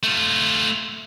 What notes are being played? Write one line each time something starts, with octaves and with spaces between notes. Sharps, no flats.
A3 F4